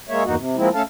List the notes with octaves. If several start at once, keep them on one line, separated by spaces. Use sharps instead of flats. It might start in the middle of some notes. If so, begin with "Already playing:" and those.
G#3 A#3 C#5 E5
E2 G2 A#3 D#4 F#4
C3
F3 G#3 A#3 C4 E4
A3 C#4 A4 F5 A5